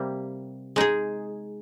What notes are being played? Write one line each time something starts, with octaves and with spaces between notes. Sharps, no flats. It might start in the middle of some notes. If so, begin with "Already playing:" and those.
Already playing: C3 G3 A#3
G#3 D#4 G#4